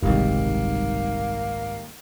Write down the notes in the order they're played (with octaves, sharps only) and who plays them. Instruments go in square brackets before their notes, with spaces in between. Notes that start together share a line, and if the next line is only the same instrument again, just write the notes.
[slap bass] F#1 C2 [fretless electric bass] G#2 [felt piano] D#3 G3 [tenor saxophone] A#3